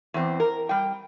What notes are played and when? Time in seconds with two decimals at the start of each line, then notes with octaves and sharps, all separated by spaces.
0.14 E2 C4
0.40 A#4
0.69 G3 G5